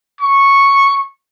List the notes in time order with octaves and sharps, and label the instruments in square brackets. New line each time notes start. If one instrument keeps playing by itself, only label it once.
[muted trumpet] C#6